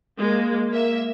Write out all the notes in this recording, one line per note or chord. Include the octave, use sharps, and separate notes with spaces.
G#3 A#3
A#3 E5